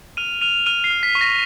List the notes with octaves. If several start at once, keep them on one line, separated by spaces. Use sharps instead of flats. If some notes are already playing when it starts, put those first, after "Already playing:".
F6 D#7 F7
F6 D#7 F7
F6 D#7 F7
C7
F6
B6
C#6
A#6